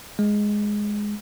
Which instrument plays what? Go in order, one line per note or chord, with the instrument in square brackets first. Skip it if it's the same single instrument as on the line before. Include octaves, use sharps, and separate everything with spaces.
[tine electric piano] G#3